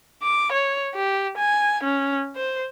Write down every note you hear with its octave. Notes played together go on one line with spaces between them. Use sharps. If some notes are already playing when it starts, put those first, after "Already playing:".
D6
C#5
G4
G#5
C#4
C5